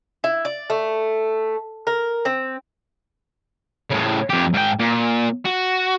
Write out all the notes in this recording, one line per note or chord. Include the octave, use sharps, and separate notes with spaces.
E4
D5
A3
A#4
C4
A2 C#3
F2 G4
G#2 G5
A#2
F#4